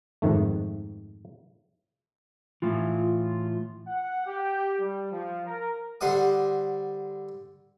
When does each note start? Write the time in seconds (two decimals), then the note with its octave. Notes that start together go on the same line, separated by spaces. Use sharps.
0.22 F2 G#2 D#3 A3
2.62 A2 E3 F4
3.88 F#5
4.26 G4
4.79 G3
5.12 F3
5.46 A#4
6.01 D3 G3 C5 F#5 D#6